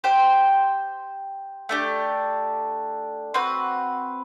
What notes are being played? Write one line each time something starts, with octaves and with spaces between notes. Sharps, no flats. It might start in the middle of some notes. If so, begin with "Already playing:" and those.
G4 C5 G5
A3 D4 G4
C4 F#4 B4